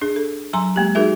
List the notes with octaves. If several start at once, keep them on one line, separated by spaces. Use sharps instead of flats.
D4 G#4
A4
F#3 G#5 A#5 C6
G#3 A#3 G4
D#4 F#4 G#4 A#4 E5